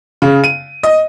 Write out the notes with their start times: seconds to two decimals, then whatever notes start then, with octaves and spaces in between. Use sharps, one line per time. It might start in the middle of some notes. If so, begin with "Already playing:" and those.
0.22 C#3
0.44 D#7
0.83 D#5